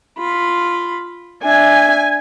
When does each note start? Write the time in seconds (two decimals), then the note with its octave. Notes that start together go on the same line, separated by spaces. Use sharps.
0.18 F4 B5
1.43 D4 E5 G#5